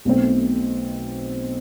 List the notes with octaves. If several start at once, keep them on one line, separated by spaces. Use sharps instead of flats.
B1 B2 A3 C4